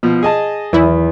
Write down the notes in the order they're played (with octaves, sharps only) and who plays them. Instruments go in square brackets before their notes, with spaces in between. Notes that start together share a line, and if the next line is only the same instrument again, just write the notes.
[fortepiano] B2 F3
G#4 D#5 A5
[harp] E2 [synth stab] E3 E4